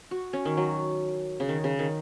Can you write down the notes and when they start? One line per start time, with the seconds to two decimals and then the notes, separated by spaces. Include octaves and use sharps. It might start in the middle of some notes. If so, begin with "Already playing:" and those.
0.11 F#4
0.33 C#4
0.45 D#3
0.57 F#3
1.40 C#3
1.49 D#3
1.64 C#3
1.79 D#3